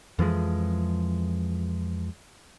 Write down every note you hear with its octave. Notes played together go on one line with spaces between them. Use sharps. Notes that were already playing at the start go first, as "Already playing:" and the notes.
F2 E3 F3 G#3